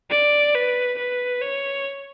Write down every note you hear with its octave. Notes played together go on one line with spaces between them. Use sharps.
D5
B4
B4
C#5